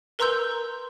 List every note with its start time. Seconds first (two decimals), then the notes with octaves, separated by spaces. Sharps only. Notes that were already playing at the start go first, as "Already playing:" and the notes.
0.19 A#4 B4 A#5 C6 E6 G6